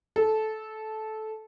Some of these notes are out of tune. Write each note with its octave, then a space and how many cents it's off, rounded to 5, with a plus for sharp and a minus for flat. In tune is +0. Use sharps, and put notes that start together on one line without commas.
A4 -15